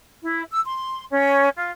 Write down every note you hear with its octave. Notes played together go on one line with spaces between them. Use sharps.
E4
E6
C6
C#4
F4